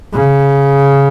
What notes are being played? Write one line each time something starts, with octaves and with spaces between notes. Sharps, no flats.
C#3